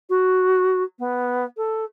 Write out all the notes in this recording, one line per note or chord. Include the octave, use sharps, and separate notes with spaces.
F#4
B3
A4